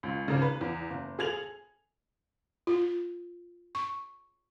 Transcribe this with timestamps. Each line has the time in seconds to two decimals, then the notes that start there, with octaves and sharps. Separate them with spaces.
0.03 C#2
0.28 G#1 C#3
0.42 B4
0.61 E2
0.90 F#1
1.19 G#4 A4 G#6 F7 F#7
2.67 F4
3.75 C#6